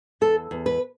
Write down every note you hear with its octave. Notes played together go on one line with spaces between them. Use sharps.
E2 A4
E2
B4